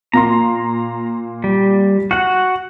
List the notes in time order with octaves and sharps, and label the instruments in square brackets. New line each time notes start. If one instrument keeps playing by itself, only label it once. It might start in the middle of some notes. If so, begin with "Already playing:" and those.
[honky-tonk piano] A#2 A#3 C6 [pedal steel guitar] A#5
[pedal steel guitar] G3
[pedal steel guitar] F#4 F#5 [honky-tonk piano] F#6